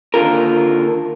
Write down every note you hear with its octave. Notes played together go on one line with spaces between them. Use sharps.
D#2 D3 F4 A#4